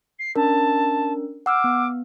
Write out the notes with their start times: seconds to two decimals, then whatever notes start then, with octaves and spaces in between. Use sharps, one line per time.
0.19 C7
0.36 C#4 D4 A#4 A5
1.46 F#5 D6 E6 F6
1.64 B3